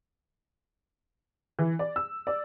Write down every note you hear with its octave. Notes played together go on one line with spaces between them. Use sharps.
E3
D5
E6
D5